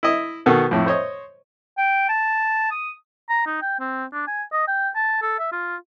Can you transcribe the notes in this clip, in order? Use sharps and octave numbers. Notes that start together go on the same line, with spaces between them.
E4 D#5
B2 D#3 B3 A4
F2 A2
C5 C#5 D#5
G5
A5
D#6
A#5
D#4
G5
C4
D4
G#5
D#5
G5
A5
A4
E5
F4